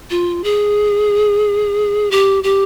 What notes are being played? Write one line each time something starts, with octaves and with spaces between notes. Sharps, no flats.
F4
G#4
G4
G4